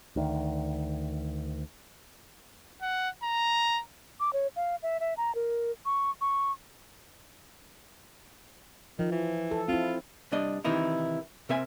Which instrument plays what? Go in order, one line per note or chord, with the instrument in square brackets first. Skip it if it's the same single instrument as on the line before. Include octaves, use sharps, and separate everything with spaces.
[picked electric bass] D2 D#3
[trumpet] F#5
A#5
[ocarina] D6
C#5
F5
E5
E5
A#5
A#4
C#6
C#6
[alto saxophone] D#3 [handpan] F3
[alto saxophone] E3
[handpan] A4
[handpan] C4 E4 [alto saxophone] F4
[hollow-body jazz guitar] C2 G3 D4 D#5
C3 D#3 E3 D#4 E4
C3 C4 A#4 E5 G#5